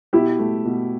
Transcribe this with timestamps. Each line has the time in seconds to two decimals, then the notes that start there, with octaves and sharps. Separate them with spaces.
0.13 B2 E4 G4
0.39 A3
0.65 B2